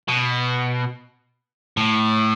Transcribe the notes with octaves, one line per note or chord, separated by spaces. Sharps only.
B2
A2